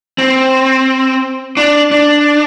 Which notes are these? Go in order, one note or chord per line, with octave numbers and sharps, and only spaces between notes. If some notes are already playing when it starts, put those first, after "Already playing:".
C4
D4
D4